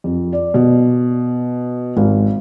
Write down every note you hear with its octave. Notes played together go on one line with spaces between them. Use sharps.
F2
D5
B2
G#1